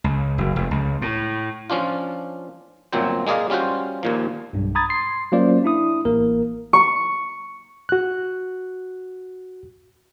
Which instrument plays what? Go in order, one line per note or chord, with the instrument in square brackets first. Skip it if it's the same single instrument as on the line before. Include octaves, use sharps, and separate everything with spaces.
[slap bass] C#2
F#1
F1
C#2
A2
[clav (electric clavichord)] F3 C#4 D4 F4
G1 A#2 F#3 C4 C5
G#3 A#3 G#4 D5 F5
G3 C#4 F4 F#4 C5
D#2 A#2 F3
[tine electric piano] B1 G2
A#5 B5 D#6 G#6 A6
C6 C7
F#3 A#3 C#4 F4 C5 D5
D4 E4 D#6
A1 A#3 A#4
[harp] C#6
[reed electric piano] F#4 F#6